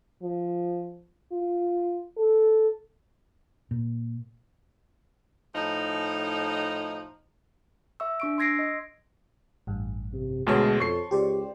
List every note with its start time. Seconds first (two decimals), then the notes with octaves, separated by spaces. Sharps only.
0.22 F3
1.32 F4
2.17 A4
3.71 A#2
5.54 A2 F3 D#4
8.00 E5 C#6 E6
8.20 D4 C#6 D7
8.38 C6 E6 G#6 A#6 C7 D7
8.59 D#5
9.67 A1 G2
10.13 C3
10.47 D2 B2 G#3 C#5 A5 C6
10.80 F2 C#6 C7
11.11 C#2 G4 C5 D5